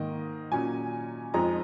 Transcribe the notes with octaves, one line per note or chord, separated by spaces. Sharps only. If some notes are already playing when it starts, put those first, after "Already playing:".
Already playing: G#2 D#3 A#3 D#5
A#2 F#3 C#4 G#5
F2 F3 G#3 D#4 A#5